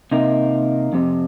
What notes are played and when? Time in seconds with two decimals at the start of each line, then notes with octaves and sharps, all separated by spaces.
0.12 C3 D#3 A#3 D#4
0.93 F2 C3